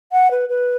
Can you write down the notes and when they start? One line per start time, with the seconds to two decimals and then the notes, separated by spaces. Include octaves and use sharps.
0.12 F#5
0.31 B4
0.49 B4